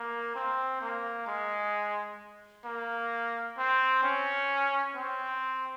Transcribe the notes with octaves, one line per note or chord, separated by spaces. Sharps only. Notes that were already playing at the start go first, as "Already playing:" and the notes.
Already playing: A#3
C4
A#3
G#3
A#3
C4
C#4
C4